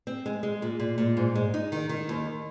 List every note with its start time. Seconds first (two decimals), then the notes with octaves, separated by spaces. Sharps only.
0.07 C4
0.26 G#3
0.43 G#3
0.62 A#2
0.79 A#2
0.98 A#2
1.17 G#2
1.35 G#3
1.54 D#4
1.72 D#3
1.89 D#3
2.09 D#2